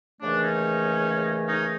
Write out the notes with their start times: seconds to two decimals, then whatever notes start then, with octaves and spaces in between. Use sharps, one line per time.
0.22 D#2 C#3 E3 A3 D4
0.43 C#4 D#4
1.47 C#4 D#4